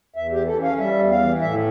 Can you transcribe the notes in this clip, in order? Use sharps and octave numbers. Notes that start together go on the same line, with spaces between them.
E2 E5
G4
E3
A4
C#4
F5
G3 E5
E2
F5
E3
A2 E5